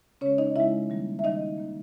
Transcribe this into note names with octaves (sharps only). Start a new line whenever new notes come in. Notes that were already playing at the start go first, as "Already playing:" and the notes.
C#3 G#3 C#4 C#5
D#4 D#5
C#3 G#3 E4 E5
D#3 G3 A#3
E5
D#3 G3 A#3 D#4 D#5
D#3 A#3